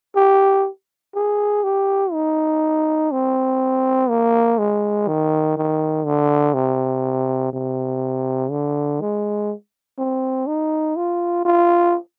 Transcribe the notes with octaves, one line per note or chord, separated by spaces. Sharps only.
G4
G#4
G4
D#4
C4
A#3
G#3
D#3
D#3
D3
C3
C3
D3
G#3
C4
D#4
F4
F4